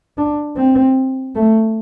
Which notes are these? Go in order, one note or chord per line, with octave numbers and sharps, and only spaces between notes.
D4
C4
A3